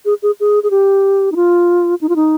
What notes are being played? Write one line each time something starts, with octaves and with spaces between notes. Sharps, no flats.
G#4
G#4
G#4
G#4
G4
D#4
F4
D#4
F4
D#4